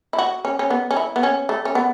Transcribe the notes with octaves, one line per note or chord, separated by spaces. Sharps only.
E4
F#4
C#4
C#4
B3
C#4
E4
B3
C#4
A3
C#4
B3